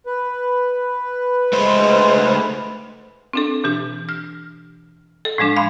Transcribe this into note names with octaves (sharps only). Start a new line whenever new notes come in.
B4
G#3 A3 C5
C4 D4 A4
B2 E3 D4 G4
F6
A4
A2 F3 G#3 D4
F5 B5 C6